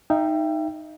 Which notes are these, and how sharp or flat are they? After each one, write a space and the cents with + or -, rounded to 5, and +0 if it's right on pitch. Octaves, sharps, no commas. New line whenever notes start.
D#4 +0 E5 +35 G5 +0